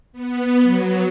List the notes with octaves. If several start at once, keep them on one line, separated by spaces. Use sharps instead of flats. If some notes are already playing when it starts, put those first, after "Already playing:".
B3
F#3